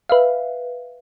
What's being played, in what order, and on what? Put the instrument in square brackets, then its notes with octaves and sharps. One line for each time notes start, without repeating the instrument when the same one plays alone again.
[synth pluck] B4 E5 F5